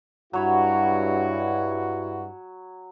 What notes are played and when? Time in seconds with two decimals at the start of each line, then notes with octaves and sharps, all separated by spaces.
0.33 G2 F#3 E4 F#4 C#5 B5